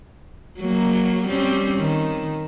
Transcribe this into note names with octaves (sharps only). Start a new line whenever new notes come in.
F#3 A#3
G3 C4 C#4
D#3